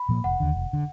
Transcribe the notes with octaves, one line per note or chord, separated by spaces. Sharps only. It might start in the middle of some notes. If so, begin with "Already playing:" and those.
Already playing: B5
A#2 F3 A#3
F1 F#5
D#2 D3
F1
D3